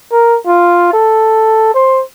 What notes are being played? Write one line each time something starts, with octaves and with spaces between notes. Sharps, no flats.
A#4
F4
A4
C5